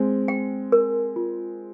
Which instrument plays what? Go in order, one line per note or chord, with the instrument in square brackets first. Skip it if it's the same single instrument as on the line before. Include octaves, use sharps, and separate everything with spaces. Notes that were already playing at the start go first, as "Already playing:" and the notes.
Already playing: [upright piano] G#3 C4
[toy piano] G5
A#4
F4